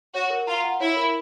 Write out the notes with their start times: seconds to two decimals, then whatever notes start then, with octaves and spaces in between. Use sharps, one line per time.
0.14 F#4 C#5
0.30 A#4
0.47 F4 A#5
0.64 F#5
0.80 E4 C#5
0.97 A#4